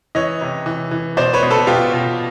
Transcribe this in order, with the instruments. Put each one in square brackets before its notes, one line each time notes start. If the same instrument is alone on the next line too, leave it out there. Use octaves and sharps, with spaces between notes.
[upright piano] E3 C#5 D#5
C3
E3
E3
B2 C5 D5
B4 C#5
B2
A4 B4
B2 F4 G4
B2